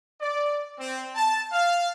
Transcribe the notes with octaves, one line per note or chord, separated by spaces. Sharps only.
D5
C4
A5
F5